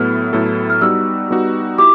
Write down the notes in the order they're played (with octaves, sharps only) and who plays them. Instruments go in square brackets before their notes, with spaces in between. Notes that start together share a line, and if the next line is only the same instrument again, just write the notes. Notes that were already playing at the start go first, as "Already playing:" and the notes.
Already playing: [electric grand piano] A2 F#3 B3 E4 A4 [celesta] F6
[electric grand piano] A2 F#3 B3 E4 A4
[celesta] F6
[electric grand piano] G3 B3 D#4 F#4 [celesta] E6
[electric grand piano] G3 B3 D#4 F#4
[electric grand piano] E4 G4 [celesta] D6